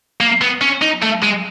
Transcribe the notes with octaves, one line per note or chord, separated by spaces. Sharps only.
A#3
B3
C#4
D#4
A3
G#3